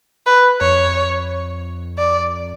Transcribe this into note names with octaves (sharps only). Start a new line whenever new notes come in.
B4
F2 C#5
D5